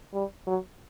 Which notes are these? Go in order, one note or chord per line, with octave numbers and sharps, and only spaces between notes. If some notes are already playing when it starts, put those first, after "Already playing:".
G3
F#3